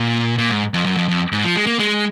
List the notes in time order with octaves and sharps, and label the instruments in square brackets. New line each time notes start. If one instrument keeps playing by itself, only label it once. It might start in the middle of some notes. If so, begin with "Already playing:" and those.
Already playing: [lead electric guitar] A#2
A#2
G#2
F2
F#2
F2
F2
G#2
F3
G#3
A#3
G#3